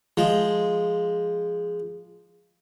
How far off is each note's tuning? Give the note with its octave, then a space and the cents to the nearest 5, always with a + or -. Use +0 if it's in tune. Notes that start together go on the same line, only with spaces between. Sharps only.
F3 +0 G#3 +0